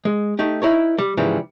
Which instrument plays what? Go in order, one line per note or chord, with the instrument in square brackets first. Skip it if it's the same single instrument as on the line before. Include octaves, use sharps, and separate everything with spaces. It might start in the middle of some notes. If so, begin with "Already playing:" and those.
[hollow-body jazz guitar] G#3
A3 D#4 G4
D#4 E4 A#4 C#5
G3
G#2 C#3 E3 F3 G3